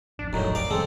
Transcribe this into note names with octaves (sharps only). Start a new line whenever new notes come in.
A1 F2 D4
D#1 F#2 A2 F#3 D#4
A#4 D5 F5
D#3 F3 G3 G#3 C4 A4